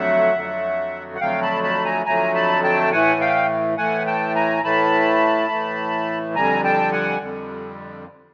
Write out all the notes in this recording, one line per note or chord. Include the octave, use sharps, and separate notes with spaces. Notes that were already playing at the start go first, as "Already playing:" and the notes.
Already playing: F2 D3 F#3 A3 E5 F#5
F2 D3 F#3 A3
F#5
F2 D3 F#3 A3 F5 G5
A5 B5
A5 B5
G#5 A#5
F2 D3 F#3 A3 G#5 A#5
A5 B5
G5 A5
A2 E3 A3 F#5 G#5
F5 G5
A2 E3 A3 F#5 G#5
G5 A5
G#5 A#5
A2 E3 A3 A5 B5
A2 E3 A3
F2 D3 G3 G#5 A#5
G5 A5
F#5 G#5
F2 D3 G3